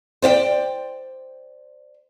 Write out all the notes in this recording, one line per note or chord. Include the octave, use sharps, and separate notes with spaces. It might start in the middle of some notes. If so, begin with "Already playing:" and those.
C5 D5 E5 G5